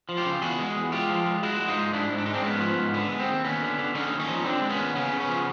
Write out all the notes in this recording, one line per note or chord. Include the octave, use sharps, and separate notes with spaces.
F3
F4 G4
C#3
E2 F#4 G#4
G#3
E2
G#3 F4 G4
F3
G#3
G#3 E4 F#4
G#3
D#4 F4
G#2
G#2 D4 E4
G#2
D4
G#3 D#4
C4 D4
G#2 B3 C#4
F3
G#2
D3 B3
G#3
C4
D#2
D#2 B3 C#4
D3
D3
D3 C#4 D#4
D#2
C#4 D#4
F3
D3 C4 D4
G#3
B3 C#4
D#2
C#3 B3 C#4
C#3
B3 C#4
F3